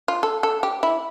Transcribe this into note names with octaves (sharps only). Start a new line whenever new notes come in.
F4
A4
A4
G4
E4